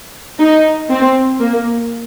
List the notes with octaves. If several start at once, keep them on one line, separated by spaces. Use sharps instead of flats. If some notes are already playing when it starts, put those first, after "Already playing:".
D#4
C4
A#3